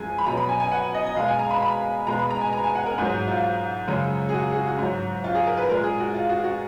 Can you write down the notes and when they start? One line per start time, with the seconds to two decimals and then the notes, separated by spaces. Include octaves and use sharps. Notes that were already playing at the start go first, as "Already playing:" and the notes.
Already playing: F#2 F3 G#3 G#5
0.18 B5
0.26 B2 F#3 A#5
0.37 B5
0.49 G#5
0.60 G#5
0.72 F#5
0.94 D#5
1.06 D#5
1.16 B2 F5
1.19 G#3
1.28 G#5
1.39 A#5
1.51 B5
1.62 B5
2.07 B2 G#3 A#5
2.19 B5
2.30 A#5
2.41 G#5
2.53 A#5
2.64 G#5
2.75 F#5
2.86 A#4
2.98 G#2 F#3 G#4
3.12 F#4
3.28 F4
3.88 F#2 C#3 G#3
4.29 G#4
4.34 F#4
4.52 G#4
4.56 F#4
4.68 F#4
4.79 G#2 F#3
5.24 F4
5.35 G#4
5.47 A#4
5.57 B4
5.69 A#2 G#3 A#4
5.84 G#4
6.00 F#4
6.15 F4
6.29 F#4
6.44 F#4